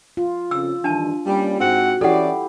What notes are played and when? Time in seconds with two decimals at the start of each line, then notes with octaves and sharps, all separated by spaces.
0.17 F4
0.51 F2 C#3 E6
0.84 G2 D#3 E3 D4 A5
1.26 G3 A#3 C#4
1.59 G#2 C4 F#4 F#5
2.01 E3 C#4 E4 G4 A4 D5 F#5